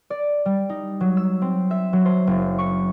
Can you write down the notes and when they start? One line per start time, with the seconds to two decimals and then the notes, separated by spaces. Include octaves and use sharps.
0.10 D5
0.46 G3
0.69 D#4
1.01 F#3
1.17 E6
1.42 C4
1.71 E5
1.93 F#3
2.05 C5
2.27 F#1
2.58 C#6